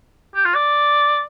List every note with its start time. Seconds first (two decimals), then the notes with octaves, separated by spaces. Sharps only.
0.35 G4
0.45 F4
0.55 D5